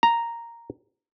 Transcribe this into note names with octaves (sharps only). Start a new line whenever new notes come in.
A#5